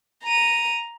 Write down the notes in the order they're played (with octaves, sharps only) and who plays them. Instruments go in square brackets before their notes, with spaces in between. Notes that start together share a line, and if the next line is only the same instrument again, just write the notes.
[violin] A#5 D#7